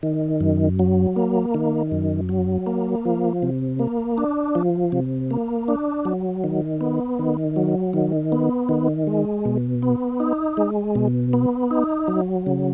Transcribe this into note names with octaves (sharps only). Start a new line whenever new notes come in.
D#3
F#2
F#3
A#3
D#3
F#2
F#3
A#3
F3
C3
A#3
D4
F3
C3
A#3
D4
F#3
D#3
B3
D#3
F#3
D#3
B3
D#3
G#3
B2
B3
D#4
G#3
B2
B3
D#4
F#3
C#3